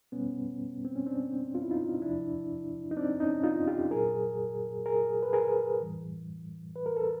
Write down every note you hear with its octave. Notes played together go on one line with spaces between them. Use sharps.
B2 G3 B3 C#4
C4
C#4
C4 D4
F4
E4
D#4 F4
E2 C3 F3 D4 E4
D#4
C4 D4
C#4 D#4
D#4 F4
F4 G4
A#2 F#3 G#4 A#4
G#4 A#4
B4
G#4 A#4
A2 E3 G3
B4
A#4
A4